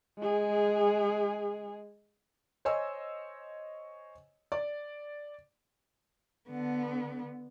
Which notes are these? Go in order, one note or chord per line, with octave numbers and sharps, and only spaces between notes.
G#3 G#4
C5 C#5 D#5 G#5 E6
D5
D3 B3